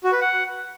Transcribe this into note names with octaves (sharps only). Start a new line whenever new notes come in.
F#4
B4
F#5